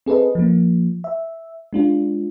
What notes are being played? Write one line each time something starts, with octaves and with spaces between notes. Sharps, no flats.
C4 G#4 A4 B4 D#5
F3 A#3
E5
G#3 D4 F4